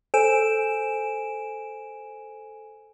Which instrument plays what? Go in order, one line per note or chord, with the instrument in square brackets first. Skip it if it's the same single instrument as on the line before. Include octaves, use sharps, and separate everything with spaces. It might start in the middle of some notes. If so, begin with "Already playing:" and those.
[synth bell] A4 C5 G#5 D7 E7